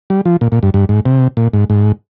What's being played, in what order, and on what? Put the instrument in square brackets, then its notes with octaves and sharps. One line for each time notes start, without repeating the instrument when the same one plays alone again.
[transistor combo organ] G3
F3
A#2
A#2
G2
G2
G#2
C3
A#2
G#2
G#2